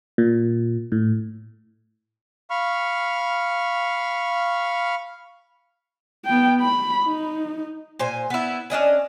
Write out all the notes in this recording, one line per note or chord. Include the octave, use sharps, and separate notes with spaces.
A#2
A2
F5 B5 C#6 F6
B3 G5
B5
D#4
A#2 C5 G#5
B3 E4
C#4 D4 D#5 G#5